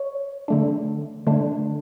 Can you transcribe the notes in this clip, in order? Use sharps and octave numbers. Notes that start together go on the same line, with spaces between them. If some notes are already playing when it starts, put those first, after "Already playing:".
Already playing: C#5
D3 A3 D4
D3 A3 D4